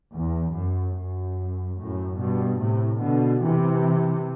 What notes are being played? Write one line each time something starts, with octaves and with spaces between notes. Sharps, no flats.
E2
F#2
F#2
F#2 A2
G2 B2
A2 C3
B2 D3
C3 E3